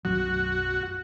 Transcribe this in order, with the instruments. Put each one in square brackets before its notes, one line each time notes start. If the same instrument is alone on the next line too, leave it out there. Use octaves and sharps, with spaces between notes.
[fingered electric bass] B1 F#2 F#3 [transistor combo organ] F#4